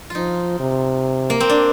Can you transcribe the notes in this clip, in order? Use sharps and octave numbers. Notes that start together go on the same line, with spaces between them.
F3 D#4 F4
C3
A#3
C4
D4